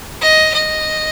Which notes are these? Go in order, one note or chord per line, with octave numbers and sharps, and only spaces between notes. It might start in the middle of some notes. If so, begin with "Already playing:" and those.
D#5
D#5